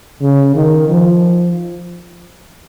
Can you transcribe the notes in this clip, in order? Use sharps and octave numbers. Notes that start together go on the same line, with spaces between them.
C#3
D#3
F3